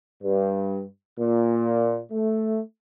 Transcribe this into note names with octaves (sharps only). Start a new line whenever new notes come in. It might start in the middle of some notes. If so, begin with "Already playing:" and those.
G2
A#2
A3